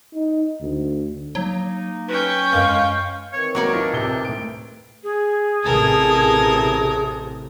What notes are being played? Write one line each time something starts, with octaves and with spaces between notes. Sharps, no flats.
D#4
D2
F#3 A#3 D#4
C#4 B4 G5
F#2 G#3 F5
D#3 E3 C4 C#5
F#3 A#3 A#4 C#5 D5 C#6
D4 D#4 F4
D1 C3 G7
A2 D7
G#4
A1 C3 A4 A#4